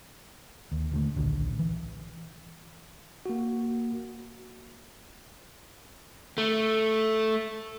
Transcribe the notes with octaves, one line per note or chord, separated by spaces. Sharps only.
D#2
D#1 D3 A3
D1 A#1 D3 D#3
E3
A#3 F#4
A3